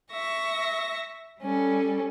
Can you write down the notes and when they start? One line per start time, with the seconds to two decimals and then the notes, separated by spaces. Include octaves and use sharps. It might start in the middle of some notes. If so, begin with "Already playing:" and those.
0.11 E5 C#6 A#6
1.41 G3 C#4 A4